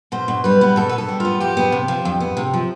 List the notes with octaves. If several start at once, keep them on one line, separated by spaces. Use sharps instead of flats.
B2 C5
B2
G3 B4
B3
B2 A4
B4
B2
A4
G3
B3 F4
F2 G4
B3
C3
F3
F2
B3
C3
F3